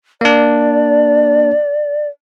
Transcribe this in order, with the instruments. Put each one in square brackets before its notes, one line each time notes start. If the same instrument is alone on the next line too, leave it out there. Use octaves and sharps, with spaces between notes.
[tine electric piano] A#3 D4 [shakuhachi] D5